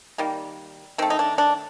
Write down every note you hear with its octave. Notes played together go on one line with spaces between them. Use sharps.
D#3 G3 A#3
D#3 A3 C4
D#4
D4
D4